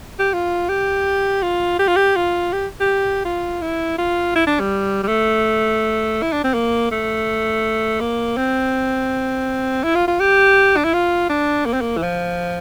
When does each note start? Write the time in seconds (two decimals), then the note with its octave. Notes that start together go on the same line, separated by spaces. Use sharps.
0.19 G4
0.33 F4
0.69 G4
1.43 F4
1.79 G4
1.88 F4
1.96 G4
2.16 F4
2.53 G4
2.80 G4
3.25 F4
3.62 E4
3.98 F4
4.36 E4
4.47 D4
4.60 G3
5.03 G3
5.08 A3
6.22 E4
6.32 D4
6.44 C4
6.54 A#3
6.91 A3
8.00 A#3
8.37 C4
9.84 E4
9.95 F4
10.08 F4
10.20 G4
10.76 D4
10.84 E4
10.93 F4
11.29 D4
11.66 A#3
11.74 C4
11.81 A#3
11.97 E3
12.03 F3